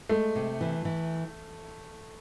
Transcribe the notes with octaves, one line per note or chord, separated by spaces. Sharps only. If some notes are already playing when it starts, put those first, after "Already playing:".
G#3 A3
C3
E3
E3